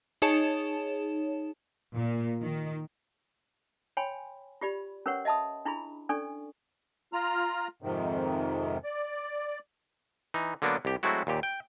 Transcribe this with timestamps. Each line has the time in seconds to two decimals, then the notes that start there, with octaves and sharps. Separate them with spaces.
0.22 D#4 G#4 C#5 A5 E7
1.94 A#2
2.40 D#3
3.97 C#5 G5 G#5 B5 C6
4.61 F4 G4 D5 B5
5.06 C#4 A#4 B4 C#5 F#5 C#6
5.25 D#5 E5 A5 B5 D#6
5.65 D4 E4 F4 G#4 B5
6.09 C#4 D4 A4 D5 G#5 C#6
7.13 F4 A#5 F6
7.82 F2 G#2 C3 D#3
8.84 D5
10.34 E3 D#4
10.62 D3 F#3 A#3 B3 D4
10.85 C2 G4
11.03 F#3 G#3 A3 C4 E4 F#4
11.27 D#2 A#2 G4
11.43 G5